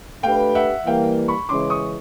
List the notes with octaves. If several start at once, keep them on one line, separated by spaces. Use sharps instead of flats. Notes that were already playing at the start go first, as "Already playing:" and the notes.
A3 D4 G4 B4 F5 G5
E5 F#5
E3 G3 A#3 F5 G5
B5 C#6
C#3 E3 G#3 C#4 C6 D6
C#6 D#6